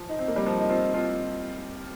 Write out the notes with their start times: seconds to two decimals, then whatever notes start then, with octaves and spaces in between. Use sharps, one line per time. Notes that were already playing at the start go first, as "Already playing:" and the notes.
Already playing: F3
0.09 D#4
0.19 C4
0.28 A#3
0.36 G3
0.46 F3
0.60 D#4
0.69 C4 F4
0.94 C4 F4